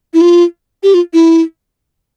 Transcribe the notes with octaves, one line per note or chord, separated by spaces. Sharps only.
E4
F4
G4
F4
E4